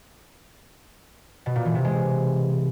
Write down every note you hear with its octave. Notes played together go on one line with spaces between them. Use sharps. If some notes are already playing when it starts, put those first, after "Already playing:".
B2
A#2
E3
C3
G#3